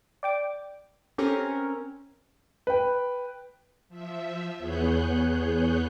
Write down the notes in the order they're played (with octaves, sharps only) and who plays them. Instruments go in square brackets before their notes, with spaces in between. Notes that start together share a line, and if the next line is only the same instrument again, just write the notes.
[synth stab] D5 G5 D6
[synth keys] C4 C#4 A#4 [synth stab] G4 A4
[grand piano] B4 G5
[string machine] F3 E5
E2 B3 G#4 C#5 F#6 G6